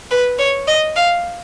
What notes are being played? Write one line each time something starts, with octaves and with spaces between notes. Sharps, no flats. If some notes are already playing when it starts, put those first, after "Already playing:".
B4
C#5
D#5
F5